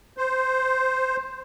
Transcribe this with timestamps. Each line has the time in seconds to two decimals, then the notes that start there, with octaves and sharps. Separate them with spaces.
0.17 C5